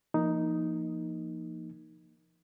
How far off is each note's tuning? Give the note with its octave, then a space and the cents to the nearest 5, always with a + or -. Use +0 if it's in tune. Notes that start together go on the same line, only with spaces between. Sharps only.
F3 -35 A#3 +0 D#4 +0